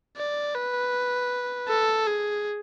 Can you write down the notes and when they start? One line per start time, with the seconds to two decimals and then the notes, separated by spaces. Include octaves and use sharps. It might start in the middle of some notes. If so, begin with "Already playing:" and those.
0.17 D5
0.54 B4
1.69 A4
2.07 G#4